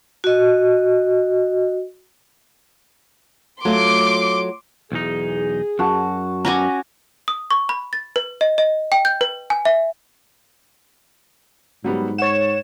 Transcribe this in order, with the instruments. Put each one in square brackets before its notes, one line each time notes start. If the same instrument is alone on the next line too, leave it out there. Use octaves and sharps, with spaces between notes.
[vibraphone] F#4 D#5
[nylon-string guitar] F#3 A3 F4 [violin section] C6 D6
[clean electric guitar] B1 E2 D#4 [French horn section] G#4
[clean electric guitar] F#2 [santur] F#4 A5
[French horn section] G3 B3 D#4 [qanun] C#4 F#4 G#5 [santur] A#5 D6
[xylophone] D#6
C#6
B5
A6
B4
D#5
D#5
G5
G6
B4
G#5
E5
[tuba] G#2 [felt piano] F#3 G3 B3
[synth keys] C#5 E7 [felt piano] F#5 A6